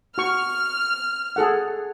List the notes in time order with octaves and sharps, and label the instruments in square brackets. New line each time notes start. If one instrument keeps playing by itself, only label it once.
[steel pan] F#4 C#6 [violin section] F6
[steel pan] G#4 A4 F#5